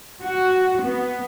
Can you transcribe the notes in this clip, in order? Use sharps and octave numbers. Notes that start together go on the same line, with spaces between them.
F#4
B3